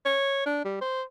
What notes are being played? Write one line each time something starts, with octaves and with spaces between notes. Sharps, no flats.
C#5
D4
G3
C5